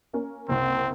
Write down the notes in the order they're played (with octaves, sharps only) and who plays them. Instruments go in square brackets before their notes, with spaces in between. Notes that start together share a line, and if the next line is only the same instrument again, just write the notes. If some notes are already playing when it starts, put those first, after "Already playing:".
[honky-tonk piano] A#3 C#4 A#4
[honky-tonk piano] F#1 C2 [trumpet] C4